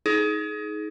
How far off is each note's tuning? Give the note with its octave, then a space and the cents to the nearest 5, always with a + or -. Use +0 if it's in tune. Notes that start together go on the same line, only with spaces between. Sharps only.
D#4 +20 G#4 +30